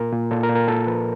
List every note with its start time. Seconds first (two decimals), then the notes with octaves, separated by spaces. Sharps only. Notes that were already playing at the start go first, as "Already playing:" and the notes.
Already playing: A#2 A#4
0.13 A#2
0.31 A#2 A4
0.43 A#4
0.49 A#2
0.55 A#4
0.68 A#2 A4
0.87 F3 B4